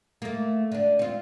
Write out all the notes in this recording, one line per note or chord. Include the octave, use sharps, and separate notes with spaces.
A3 A#3
D3 D4
C4 F4